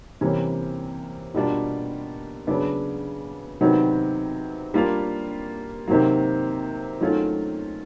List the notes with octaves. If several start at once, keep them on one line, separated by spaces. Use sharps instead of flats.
C3 E3 G3 A#3 C#4
B2 G3 A#3 D4 F4
C#3 F#3 B3 D4
C3 D#3 F#3 B3
G3 A#3 D4 F4
C3 D#3 F#3 A#3
D#3 F#3 A3 C#4 F4